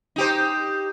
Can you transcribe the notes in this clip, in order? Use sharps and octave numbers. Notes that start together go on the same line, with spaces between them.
D#4 G4 C5